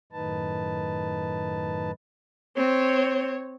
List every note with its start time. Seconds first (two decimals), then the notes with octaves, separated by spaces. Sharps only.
0.12 F#2 A2 D#3 D#4 B4 A5
2.57 C4 C#5